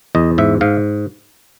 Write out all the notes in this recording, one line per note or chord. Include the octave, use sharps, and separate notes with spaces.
E2 D#5
G#2 E5
G#2 F5